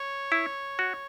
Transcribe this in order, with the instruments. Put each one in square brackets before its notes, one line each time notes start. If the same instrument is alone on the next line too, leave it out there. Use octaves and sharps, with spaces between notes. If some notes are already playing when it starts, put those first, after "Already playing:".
Already playing: [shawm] C#5
[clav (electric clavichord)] E4
F#4